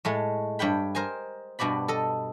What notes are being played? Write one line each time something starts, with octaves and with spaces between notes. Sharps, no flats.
A2 G#3 A3
G2 C#5 G5 B5
A#4 C5 D#5 G#5
G2 B2 F#4 D5 B5
A4 D#5